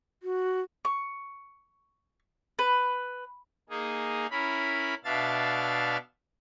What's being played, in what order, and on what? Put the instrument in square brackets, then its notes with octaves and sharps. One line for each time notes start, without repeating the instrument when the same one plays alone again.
[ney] F#4
[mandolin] C#6
B4
[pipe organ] A#3 D#4 G#4
C#4 E4 A#4 B5
B2 D4 E5 F5 A6